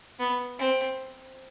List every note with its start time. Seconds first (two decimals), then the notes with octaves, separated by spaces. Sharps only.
0.19 B3
0.59 C4